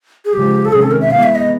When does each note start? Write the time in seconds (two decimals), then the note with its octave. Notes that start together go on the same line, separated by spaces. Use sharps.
0.25 G#4
0.33 C#3 F3 G#3 G4
0.65 A4
0.72 C3 D#3 G#3 C#4 G#4
0.82 A4
0.91 A#4
1.01 E5
1.10 C3 E3 G#3 B3 F5
1.23 E5
1.35 D#5